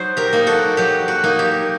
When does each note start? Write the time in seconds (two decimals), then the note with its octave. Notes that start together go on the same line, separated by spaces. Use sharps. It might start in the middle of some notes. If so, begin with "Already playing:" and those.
Already playing: F#3 D#4 C5
0.17 G4 A#4
0.33 A#3 D#4
0.47 F#4 A4
0.77 F#3 G4
1.08 F#4
1.24 A#3 D#4
1.39 G4